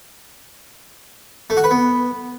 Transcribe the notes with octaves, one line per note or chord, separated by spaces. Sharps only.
A3
F#4
B4
B3